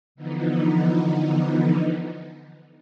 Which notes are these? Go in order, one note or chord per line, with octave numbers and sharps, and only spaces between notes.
D3 E3 F3 B3 D#4